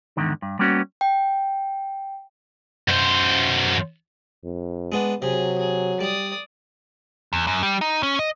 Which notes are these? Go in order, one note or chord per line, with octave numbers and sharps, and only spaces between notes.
E2 G#2 D3 D#3
G2
G3 A#3 B3 C#4 F#4
G5
F#2 C5
F2
G#3 B3 D4
C3 F#3 G#4
G#4
G3 D5 D#6
E2
F#2
G3
D#4
C#4
D#5